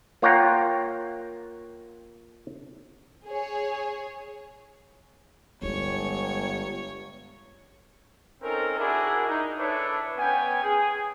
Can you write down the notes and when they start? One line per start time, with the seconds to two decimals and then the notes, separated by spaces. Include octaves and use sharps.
0.22 A#3 F4 C#5 F#5 G5 A#5
3.25 G#4 C#5
5.62 G1 G#3 B3 C#5
8.42 C4 C#4 D#4 A4 A#4
8.77 D4 E4 F#4 G#4 A#4
9.28 D#4
9.58 D4 E4 A4 B4 C#5
10.17 B3 C#4 G5 G#5
10.63 G#4